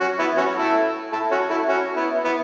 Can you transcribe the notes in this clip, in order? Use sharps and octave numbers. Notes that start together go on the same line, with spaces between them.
C#4 F#4
B3 E4
C#4 F#4
E4 A4
E4 A4
C#4 F#4
E4 A4
C#4 F#4
B3 E4
B3 E4